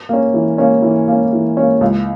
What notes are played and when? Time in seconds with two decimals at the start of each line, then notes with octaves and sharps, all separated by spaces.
0.09 A#3 C#4
0.34 E3
0.58 A#3 C#4
0.82 E3
1.08 A#3 C#4
1.33 E3
1.57 A#3 C#4
1.81 C#2